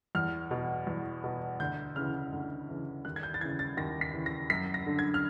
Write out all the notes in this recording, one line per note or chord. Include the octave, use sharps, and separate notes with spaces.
E2 F6
B2
E2
B2
D2 G6
C#3 E3 F6
D2
C#3 E3
D#2 F#6
G#6
G6
A6
C#3 E3 G#6
A6
D#2 A#6
B6
C#3 E3
A#6
F#2 B6
A#6
D3
G#6
F6